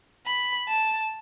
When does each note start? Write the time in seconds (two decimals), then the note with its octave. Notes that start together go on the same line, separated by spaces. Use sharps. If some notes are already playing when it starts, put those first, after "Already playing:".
0.26 B5
0.68 A5